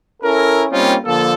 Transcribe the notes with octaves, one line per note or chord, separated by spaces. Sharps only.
C#4 E4 A4 A#4
G3 A#3 C4 C#4 D#4 F4
D3 F3 A#3 A4